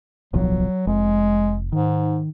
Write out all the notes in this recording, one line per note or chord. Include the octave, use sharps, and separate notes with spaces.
D1 B1 F3 F#3
F1 G#3
G#2 D#3